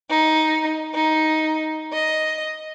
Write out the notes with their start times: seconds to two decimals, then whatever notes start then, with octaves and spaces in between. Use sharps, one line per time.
0.10 D#4
0.93 D#4
1.92 D#5